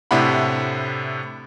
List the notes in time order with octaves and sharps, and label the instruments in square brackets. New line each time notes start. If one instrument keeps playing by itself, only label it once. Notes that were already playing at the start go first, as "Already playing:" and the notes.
[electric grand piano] A2 C3 D4 E4 F#5 B5